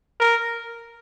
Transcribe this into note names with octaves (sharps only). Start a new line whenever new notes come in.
A#4